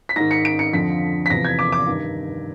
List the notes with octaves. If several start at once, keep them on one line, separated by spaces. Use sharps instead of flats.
B6
G#2 D#3 A#6
C#7
D7
C#7
F2 D3 F3 B6
B6
E2 C3 F3 A#6
G#6
D6
D6
G2 D#3